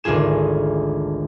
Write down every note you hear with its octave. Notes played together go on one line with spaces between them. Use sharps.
G#1 D2 A3 F4 G#4 E7